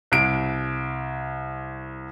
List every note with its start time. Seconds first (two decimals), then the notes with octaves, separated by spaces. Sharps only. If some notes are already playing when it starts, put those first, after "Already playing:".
0.12 C2 D7